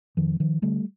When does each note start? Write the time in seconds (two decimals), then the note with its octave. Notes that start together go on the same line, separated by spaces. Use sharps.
0.17 F2 D#3 F3
0.40 D#3 F3
0.62 D3 G3 A3